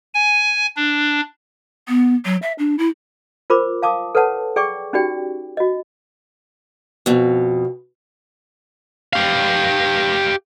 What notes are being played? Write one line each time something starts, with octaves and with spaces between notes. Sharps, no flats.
G#5
D4
B3
F#3
E5
D4
E4
F4 A#4 C5 B5 D6
F5 A5 D6 D#6
A4 B4 C#5 F#5 A5
G#4 D5 G5 C#6 D6
C#4 D#4 F#4 G4 D5 G5
F#4 D#5
F2 B2
G4 F5